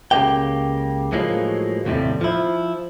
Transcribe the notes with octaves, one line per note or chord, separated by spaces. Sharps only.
C#2 C#3 A3 A#3 G4 G5
A2 F3 F#3 G#3 A#3
D#2 A2 C3 G3 A3
F3 E4